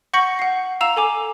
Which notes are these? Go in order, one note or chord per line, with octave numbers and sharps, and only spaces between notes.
F#5 C#6 G6 A#6 C#7 F#7
F#5 C7
F5 A#5 E6 E7 F7
A4 G#5 D6